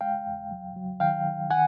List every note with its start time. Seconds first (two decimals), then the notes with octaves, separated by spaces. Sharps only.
0.01 G#3 F5 G5
0.26 E2
0.51 F#3
0.76 F#3
1.00 D#3 F5 G5
1.25 D#3
1.50 D#3 F#5 G#5